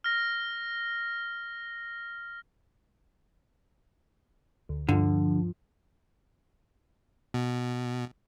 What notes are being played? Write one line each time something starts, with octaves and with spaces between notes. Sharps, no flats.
F6 A#6
D2
G2 D3 F3
B2